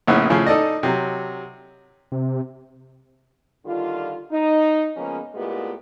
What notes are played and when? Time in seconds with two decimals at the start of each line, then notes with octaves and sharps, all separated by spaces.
0.07 A#1 A2 C#3 B3
0.30 A2 C#3 F3 G#5
0.47 D#4 A4 D5 D#5
0.83 C3 F#3
2.12 C3
3.65 D3 D#3 G3 F4
4.31 D#4
4.96 C#3 F3 G#3 A#3 B3 C#4
5.34 A#2 G#3 A3 B3 E4 G4